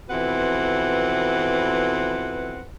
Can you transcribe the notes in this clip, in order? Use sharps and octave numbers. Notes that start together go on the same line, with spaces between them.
F2 B2 E3 C4 B4 F#5